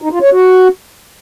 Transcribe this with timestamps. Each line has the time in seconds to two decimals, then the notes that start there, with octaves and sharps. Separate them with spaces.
0.02 D#4
0.12 F4
0.22 C#5
0.31 F#4